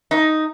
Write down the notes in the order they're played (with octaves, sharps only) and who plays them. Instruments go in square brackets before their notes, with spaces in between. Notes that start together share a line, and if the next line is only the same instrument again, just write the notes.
[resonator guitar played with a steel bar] D#4